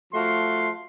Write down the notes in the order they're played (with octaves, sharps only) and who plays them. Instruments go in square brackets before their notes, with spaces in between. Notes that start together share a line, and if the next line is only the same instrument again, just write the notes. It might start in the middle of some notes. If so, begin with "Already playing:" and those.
[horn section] F3 A3 F#4 F5 C6